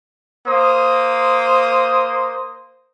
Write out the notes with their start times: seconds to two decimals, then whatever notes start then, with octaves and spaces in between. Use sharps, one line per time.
0.45 A#3 C5 D#6